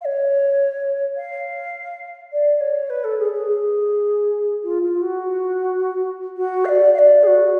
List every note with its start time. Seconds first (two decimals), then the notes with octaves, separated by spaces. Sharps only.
0.01 F5
0.05 C#5
1.17 F5
2.33 D5
2.61 C#5
2.90 B4
3.04 A4
3.19 G#4
3.34 G#4
4.64 F4
4.82 F4
5.02 F#4
6.37 F#4
6.65 F5
6.69 D5
6.94 F5
6.99 D5
7.23 G#4
7.27 F#4